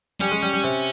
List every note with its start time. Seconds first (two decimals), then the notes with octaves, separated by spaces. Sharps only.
0.21 G3 C#4
0.31 G#3
0.42 G3
0.53 G3
0.64 C3